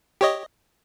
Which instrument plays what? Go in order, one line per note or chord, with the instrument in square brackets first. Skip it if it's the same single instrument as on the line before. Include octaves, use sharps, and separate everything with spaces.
[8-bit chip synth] G4 C#5 D#5